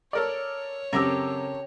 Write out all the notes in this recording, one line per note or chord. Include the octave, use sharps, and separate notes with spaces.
A4 A#4 C#5 D5
F#2 C#3 C4 G4 A4 A#4 E6